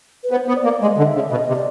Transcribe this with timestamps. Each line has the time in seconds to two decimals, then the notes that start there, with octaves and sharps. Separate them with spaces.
0.24 B4
0.31 B3 C5
0.48 B3
0.57 D5
0.64 A#3
0.82 G#3 D#5
0.97 D3
1.06 E5
1.15 C#3
1.31 B2 D#5
1.48 C3
1.55 D5